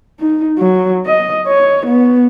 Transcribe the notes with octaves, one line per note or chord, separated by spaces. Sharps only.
D#4
F#3
D#5
C#5
B3